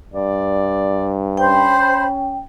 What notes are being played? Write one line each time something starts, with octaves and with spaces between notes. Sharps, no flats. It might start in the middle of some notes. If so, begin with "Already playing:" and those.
G2 D5
C#4 C5 G5 B5